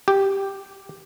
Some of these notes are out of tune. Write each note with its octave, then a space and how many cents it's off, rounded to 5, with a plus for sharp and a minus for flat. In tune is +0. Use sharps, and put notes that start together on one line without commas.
G4 -5